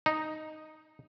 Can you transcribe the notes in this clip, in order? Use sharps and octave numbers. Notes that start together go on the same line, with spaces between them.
D#4